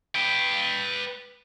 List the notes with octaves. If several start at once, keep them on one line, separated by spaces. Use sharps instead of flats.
B4 G5